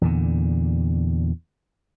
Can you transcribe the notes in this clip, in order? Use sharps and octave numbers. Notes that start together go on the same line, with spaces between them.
E2 A#2 D3